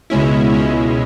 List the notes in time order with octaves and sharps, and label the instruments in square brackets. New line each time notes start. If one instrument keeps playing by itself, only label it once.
[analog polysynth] C#2 B2 G#3 C#4 E4
C#2 B2 G#3 C#4 E4